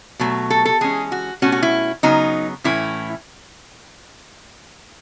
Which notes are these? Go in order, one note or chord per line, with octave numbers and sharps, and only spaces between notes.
B2 F#3 A3
A4
A4
E3 G#3 C#4 G#4
F#4
B2 A3 C#4 F#4
F#4
E4
C#3 F#3 B3 D#4
A2 E3 A3 C#4 E4